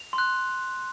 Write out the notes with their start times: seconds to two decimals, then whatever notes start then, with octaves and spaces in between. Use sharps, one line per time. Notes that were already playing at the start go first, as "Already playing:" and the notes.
Already playing: F7
0.13 C6
0.18 F#6